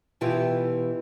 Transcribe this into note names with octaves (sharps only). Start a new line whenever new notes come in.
B2 E3 E4 F4 G4 B4